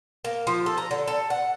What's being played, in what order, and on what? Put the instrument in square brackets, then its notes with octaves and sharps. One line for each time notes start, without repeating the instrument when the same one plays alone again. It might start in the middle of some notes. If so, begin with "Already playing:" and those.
[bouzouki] A#3
F3
A4
A#5
D3
A4
F#5